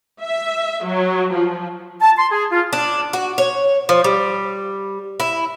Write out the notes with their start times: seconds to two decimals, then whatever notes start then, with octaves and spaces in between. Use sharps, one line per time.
0.21 E5
0.84 F#3
1.32 F3
2.01 A5
2.18 C6
2.32 G#4
2.51 F4
2.73 D4
3.13 F#4
3.38 C#5
3.89 F3
4.04 G3
5.20 E4